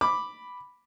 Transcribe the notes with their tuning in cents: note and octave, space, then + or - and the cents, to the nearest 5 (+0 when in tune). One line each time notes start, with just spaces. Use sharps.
B5 +0 D6 +0